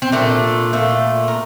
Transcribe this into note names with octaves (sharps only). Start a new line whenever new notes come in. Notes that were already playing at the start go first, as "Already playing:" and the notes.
C4
A#2 A3 D4
A#2 A3
A#4